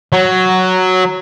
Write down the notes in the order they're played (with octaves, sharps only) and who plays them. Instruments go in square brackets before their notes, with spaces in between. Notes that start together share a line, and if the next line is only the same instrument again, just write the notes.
[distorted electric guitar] F#3